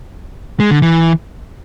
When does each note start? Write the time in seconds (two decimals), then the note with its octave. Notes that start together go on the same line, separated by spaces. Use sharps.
0.60 G#3
0.71 D3
0.82 E3